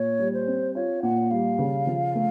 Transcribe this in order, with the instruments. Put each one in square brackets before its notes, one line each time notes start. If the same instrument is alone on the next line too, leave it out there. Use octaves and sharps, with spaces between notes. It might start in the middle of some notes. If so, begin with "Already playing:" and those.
Already playing: [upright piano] A#2 [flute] C#5
[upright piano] G3
[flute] C5
[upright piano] C4
[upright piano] F4 [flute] C#5
[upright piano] A#2 [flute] F#5
[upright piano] G3 [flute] F5
[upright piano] C#3
F3
A3